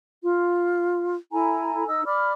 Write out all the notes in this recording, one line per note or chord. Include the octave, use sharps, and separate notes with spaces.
F4
E4 A4 G#5 A#5
D#4 E6
D5 B5 D6 F6